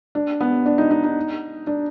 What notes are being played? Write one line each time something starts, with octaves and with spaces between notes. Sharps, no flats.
D4
B3
D4
D#4
D#4
D#4
D4